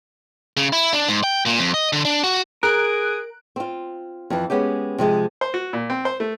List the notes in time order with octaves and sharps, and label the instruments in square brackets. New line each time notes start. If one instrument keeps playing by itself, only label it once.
[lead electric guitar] C#3
E4
D4
G#2
G5
A#2
F2
D#5
D3
D4
F#4
[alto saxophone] G#4 [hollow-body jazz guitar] A#4 [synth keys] F#6 D7
[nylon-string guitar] C4 F4
F2 E3
G#3 B3 C#4 G4
C3 F3 G#3 D#5
[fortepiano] C5
F#4
A#2
C4
C5
A3